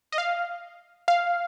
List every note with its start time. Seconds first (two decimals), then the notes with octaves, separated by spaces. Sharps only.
0.12 D#5
0.18 F5
1.08 F5